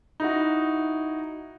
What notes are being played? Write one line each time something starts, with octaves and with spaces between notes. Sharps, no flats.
D#4 E4 F#4